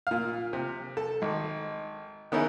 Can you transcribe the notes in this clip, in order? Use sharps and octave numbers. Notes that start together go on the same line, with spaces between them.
A#2 F5
C3
A4
G#1
D#3 B3 C#4 D#4 E4 G#4